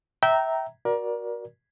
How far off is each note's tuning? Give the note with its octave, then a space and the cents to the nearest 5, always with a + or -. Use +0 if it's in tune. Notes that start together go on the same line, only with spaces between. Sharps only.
E5 -15 G5 -20 A#5 +0
F#4 +0 A#4 +30 D5 +0